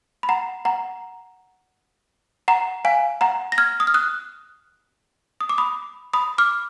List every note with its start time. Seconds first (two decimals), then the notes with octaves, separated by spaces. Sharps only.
0.23 B5
0.29 F#5 A#5
0.65 F#5 A#5
2.48 F#5 A#5
2.85 F5 G#5
3.21 F#5 A#5
3.52 A#6
3.58 F6 G#6
3.80 D#6
3.87 F6
3.94 D#6 F#6
5.41 D#6
5.49 D6
5.58 B5 D#6
6.13 B5 D#6
6.38 D6 F6